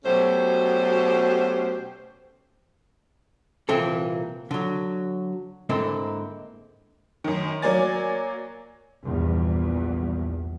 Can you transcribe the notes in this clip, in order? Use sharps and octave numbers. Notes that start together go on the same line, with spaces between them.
B2 F#3 A3 C#4 G4 C5
C2 A#2 E3 C4 A4
D3 F#3
G#2 D3 A#3 C4 E4
F#2 D#3
F#3 A#3 D5 G#5 A6
A#1 E2 G2